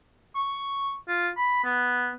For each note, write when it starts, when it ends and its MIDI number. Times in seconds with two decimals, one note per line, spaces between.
0.35 0.92 85
1.08 1.28 65
1.37 1.59 83
1.64 2.13 59